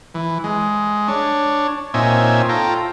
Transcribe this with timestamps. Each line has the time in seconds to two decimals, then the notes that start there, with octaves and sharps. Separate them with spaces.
0.14 E3
0.44 G#3
1.08 D4 C#5
1.94 A#2 C4 D#4 C#5 E5 G#5
2.49 F4 A4 G5 A#5